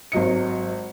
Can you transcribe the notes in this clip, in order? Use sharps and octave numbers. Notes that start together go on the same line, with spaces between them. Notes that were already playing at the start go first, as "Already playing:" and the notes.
G#1 F#3 D#5 C#7